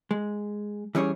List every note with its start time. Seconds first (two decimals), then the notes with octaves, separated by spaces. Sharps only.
0.11 G#3
0.95 E3 G3 C#4 G#4 C#5